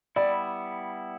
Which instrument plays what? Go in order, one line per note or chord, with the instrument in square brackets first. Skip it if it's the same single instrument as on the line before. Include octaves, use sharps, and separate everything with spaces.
[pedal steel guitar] G3 B3 E4 [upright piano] D5